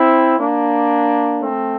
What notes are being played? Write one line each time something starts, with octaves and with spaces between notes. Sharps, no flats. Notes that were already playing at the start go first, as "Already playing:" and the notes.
Already playing: C4 E4
A#3 D4
A3 C4